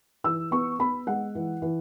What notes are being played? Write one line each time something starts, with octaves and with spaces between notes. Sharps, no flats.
E3 E6
B3 C#6
B3 B5
G#3 F#5
E3
E3